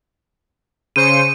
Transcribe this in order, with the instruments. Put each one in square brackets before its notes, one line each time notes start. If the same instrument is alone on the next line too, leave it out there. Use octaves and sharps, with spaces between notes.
[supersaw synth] C#3 C5 C#7 [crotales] D#7